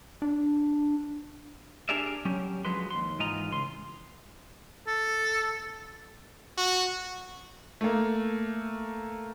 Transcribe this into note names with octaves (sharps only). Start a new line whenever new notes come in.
D4
D4 G4 G#4 A#4 D5 E5
F#3 C#4 G4
D3 F3 F#3 G#3 B4 C6
D#2 C6
G#2 E3 F4 D#5 A#5
C#2 C6
A4
F#4
A3 A#3